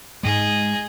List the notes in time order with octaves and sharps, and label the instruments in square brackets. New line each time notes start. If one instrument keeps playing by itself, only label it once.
[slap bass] G#2 G#3 [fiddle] G#4 D#5